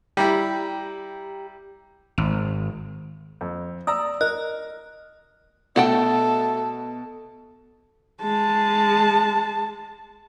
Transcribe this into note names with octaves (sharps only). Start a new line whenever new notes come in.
G3 E4 G4 G5 A#5
G#1
F2
D5 A#5 D#6 E6
A#4 D#5 F#6
B2 A3 A4 F#5 G5
G#3 A5